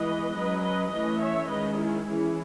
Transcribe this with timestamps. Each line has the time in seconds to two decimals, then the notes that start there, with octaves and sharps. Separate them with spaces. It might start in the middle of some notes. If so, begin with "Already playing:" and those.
Already playing: E3 G#3 B3 B4 D#5
0.35 F#3 C#4 B4 D#5
0.63 B4 D#5
0.92 E3 A3 C#4 B4 D#5
1.20 C#5 E5
1.49 D#3 G#3 C#4 B4 D#5
1.77 E4 G#4
2.05 E3 G#3 C#4 E4 G#4